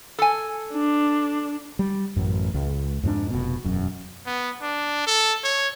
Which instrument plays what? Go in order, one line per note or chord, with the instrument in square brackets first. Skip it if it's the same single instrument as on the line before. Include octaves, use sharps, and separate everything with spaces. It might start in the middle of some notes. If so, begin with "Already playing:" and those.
[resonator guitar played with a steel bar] A4 G#5
[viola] D4
[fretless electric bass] G3
A1 F#2
C#2
F2 G#2 G3 D4
F1 B2
E1 F#2
[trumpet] B3
D4
A4
C#5